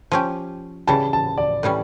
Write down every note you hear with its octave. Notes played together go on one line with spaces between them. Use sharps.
F3 C#4 G4
C#3 E3 G3 A5
A5
D5
A2 E3 G3 C#4